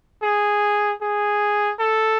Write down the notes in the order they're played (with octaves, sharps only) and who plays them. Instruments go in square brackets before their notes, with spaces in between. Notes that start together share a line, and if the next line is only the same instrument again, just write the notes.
[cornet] G#4
G#4
A4